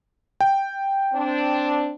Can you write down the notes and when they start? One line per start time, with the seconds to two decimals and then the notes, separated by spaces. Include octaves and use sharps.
0.41 G5
1.14 C4 D4